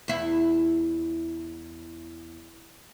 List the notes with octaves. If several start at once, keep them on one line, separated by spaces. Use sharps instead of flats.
E2 E4